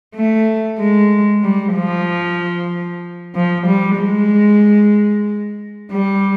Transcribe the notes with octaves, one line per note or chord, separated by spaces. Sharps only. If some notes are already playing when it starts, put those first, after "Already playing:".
A3
G#3
G3
F3
F3
G3
G#3
G3